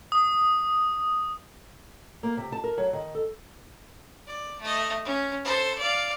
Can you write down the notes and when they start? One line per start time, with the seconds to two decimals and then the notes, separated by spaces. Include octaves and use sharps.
0.12 D#6
2.23 A#3
2.37 C3
2.52 A5
2.64 A#4
2.78 F#3
2.93 D#3
3.15 A4
4.27 D5
4.61 A3 D#5
5.05 C#4
5.44 A4 C5
5.78 D5 F5